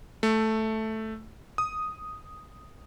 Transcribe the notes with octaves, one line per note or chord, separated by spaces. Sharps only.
A3
D#6